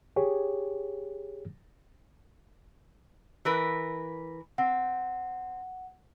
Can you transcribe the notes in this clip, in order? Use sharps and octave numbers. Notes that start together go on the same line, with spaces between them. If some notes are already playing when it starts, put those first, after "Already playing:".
G4 G#4 C#5
E3 A#4 B4
C4 F#5